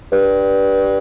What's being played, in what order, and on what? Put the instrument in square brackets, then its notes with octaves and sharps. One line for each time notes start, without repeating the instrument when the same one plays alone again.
[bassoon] G2